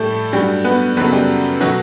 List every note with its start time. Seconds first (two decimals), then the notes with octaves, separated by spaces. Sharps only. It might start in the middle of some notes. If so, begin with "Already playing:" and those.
Already playing: A2 G3 A3 G4 A4 G5
0.33 G2 F#3 G3 A3 G4
0.64 B3 B4
0.97 F#2 C#3 F#3 A3 B3 B4
1.12 G3 G4
1.61 B2 F#3 A3 F#4